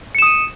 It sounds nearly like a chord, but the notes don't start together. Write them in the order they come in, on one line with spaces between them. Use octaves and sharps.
C#7 E7 D#6 D#7